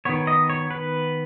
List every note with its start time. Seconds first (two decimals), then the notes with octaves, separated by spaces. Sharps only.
0.05 D#3 B3 C#5
0.27 D#5
0.50 C#5
0.71 B4